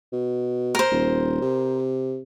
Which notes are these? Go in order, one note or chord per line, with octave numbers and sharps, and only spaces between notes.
B2
A#4 C5
D#1
C3